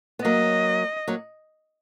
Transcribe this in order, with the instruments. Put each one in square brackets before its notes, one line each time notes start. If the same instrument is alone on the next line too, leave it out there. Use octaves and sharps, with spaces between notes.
[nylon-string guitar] B3
[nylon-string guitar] F#3 A#3 [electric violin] D#5
[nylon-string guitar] F#3 A#3